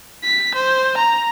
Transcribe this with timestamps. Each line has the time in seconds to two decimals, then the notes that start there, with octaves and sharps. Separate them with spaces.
0.24 B6
0.55 C5
0.97 A#5